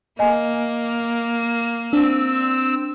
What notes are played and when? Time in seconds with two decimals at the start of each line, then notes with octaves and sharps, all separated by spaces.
0.19 A#3 D#5 G#5
1.93 C4 D4 E6